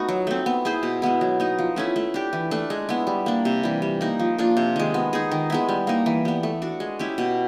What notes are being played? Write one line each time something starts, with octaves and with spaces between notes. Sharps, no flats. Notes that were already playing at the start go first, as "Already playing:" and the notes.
Already playing: A3 B3 D#4 F#4
F#3
A3 C4
B3
E4 G#4 C5
B2
G#3 B3 E4
F#3
B3 D#4
F3
A3 C#4 E4
A3
D4 G4
E3
A3 D4
G#3
B3 E4
G3
A#3 D4
C3
E3 G3
G3
A#3 D#4
F3
A#3 D4 F4
C3
D#3 G#3
B3
D#4 G#4
D#3
G#3 B3 E4
G3
A#3 D#4
E3
G3 B3
A3
D4 F#4
G#3
C#4 E4 G4
B2